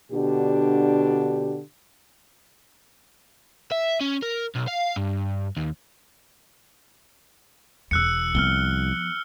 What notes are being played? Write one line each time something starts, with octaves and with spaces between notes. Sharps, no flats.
B2 D3 D4 G4
E5
C#4
A#4
B1
F5
G2
D#2
E1 E2 E6 F#6 C#7
C2 F3 B3 F6 G7